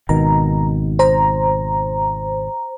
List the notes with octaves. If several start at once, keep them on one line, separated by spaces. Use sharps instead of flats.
G#1 B2 D#3 A#5
C5 A#5